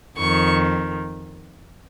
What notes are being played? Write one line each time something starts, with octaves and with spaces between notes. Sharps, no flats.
F2 D#3 C#6